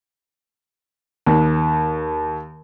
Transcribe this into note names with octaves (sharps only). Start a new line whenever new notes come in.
D#2